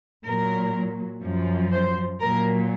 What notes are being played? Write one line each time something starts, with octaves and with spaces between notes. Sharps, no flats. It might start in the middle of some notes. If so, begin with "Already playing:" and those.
A#2 F#3 A#4
F#2 F3
C5
A#2 F#3 A#4